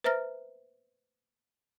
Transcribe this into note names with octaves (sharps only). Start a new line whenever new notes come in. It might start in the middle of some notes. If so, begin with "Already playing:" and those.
B4 C5 E5 A#5 F6 A#6